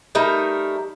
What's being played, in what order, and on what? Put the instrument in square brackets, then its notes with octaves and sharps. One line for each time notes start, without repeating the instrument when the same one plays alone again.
[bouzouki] G3 A3 D#4 A#4